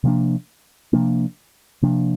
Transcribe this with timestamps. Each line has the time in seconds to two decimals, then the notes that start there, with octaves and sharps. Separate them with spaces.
0.04 C3 F3 A#3 D4
0.93 C3 F3 A#3 D4
1.82 C3 F3 A#3 D4